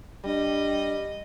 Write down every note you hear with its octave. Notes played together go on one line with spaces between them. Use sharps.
G3 D4 D#5